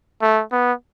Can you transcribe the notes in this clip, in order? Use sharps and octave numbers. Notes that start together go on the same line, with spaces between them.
A3
B3